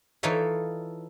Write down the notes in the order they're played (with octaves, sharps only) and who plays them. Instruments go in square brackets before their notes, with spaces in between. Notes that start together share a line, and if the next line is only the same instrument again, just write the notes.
[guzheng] E3 D#4 F4 A4 C#5 E5